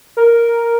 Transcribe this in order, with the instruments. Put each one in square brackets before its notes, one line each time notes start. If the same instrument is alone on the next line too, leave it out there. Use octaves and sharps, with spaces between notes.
[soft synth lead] A#4